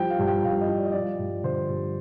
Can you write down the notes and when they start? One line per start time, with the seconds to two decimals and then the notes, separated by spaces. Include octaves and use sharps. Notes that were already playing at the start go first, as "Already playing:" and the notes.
Already playing: F3 G3 G5
0.10 F5
0.19 G2
0.28 G5
0.44 G2 F5
0.61 D#5
0.69 F3
0.77 D5
0.85 D#5
0.92 F3 D5
1.19 G2
1.44 D3 C5
1.69 G2